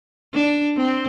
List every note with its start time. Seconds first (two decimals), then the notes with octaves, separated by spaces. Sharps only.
0.34 D4
0.77 C4